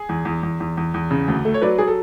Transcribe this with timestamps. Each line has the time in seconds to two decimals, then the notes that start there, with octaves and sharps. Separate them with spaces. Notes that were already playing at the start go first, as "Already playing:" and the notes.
Already playing: G#4
0.09 E2
0.25 E2
0.43 E2
0.60 E2
0.77 E2
0.94 E2
1.11 C#3
1.28 D2
1.45 A3
1.54 C#5
1.62 F#3 B4 D5
1.78 F#3 G#4
1.88 A4